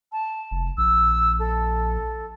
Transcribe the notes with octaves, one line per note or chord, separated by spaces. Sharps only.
A5
F1
A#1 E6
A4